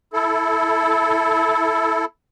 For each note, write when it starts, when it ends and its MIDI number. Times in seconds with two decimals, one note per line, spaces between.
0.13 2.05 64
0.13 2.05 69